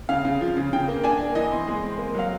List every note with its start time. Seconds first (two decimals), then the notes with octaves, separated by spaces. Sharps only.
0.09 C#3 F5
0.25 C#3
0.41 F3
0.57 C#3
0.73 C#3 G5
0.88 A#3
1.04 D4 G#5
1.20 A#3
1.35 E3 D#5
1.51 C4
1.67 G#3
1.83 C4
1.98 A#3
2.15 F#3 F5